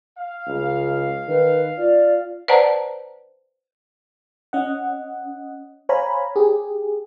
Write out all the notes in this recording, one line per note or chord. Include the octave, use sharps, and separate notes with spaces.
F5
C#2
D#3 B4
F4 D5
B4 C5 D5 F#5 A5 A#5
C#4 D#5 F#5
C5 C#5 F5 G#5 A#5 B5
G4 G#4